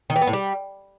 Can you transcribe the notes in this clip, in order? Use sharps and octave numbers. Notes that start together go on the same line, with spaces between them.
D#3
E3
B3
A2
G3